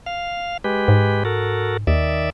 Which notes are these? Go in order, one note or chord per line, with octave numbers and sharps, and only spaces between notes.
F5
G#3 G4 B4
G#2
F#4 A4 A#4
D#2 D#3 D5 E5